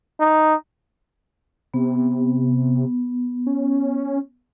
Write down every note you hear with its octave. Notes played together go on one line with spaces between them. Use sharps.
D#4
C3 B3
C#4